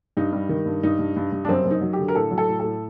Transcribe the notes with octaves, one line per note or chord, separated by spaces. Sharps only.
G2 D#4
G3
D#3
G2
G2 D#4
G2
G2
G2
D4
F#2 C4
F#2
D#4
F#3
G4
D3
A#4
A2 A4
F#3
A4
A2
A2 A4